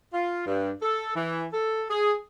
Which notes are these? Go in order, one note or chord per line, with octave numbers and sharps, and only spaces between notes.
F4
G2
A4
E3
A4
G#4